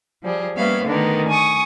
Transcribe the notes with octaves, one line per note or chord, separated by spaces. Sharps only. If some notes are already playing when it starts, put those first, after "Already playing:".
F3 G3 G#4
G3 A#3 B3 C#4 E5 F5
D3 D#3 A3 B3 D4 A#4
G#5 C#6 D#6